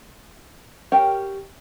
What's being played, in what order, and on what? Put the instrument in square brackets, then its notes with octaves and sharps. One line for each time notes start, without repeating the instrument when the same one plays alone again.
[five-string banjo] C#4 G4 A#4 F#5 G5